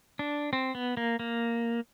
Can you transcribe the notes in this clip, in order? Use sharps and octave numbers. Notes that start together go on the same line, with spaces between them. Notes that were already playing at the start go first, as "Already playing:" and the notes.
D4
C4
B3
A#3
A#3